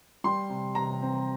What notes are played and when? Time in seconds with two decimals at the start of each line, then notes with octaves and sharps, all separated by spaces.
0.24 G3 C6
0.49 C3
0.75 C3 A#5
1.02 C4